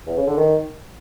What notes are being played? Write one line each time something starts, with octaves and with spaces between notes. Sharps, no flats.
E2
C#3
D3
D#3